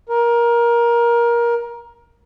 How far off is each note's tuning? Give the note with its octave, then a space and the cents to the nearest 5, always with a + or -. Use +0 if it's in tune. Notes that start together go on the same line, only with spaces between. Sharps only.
A#4 +20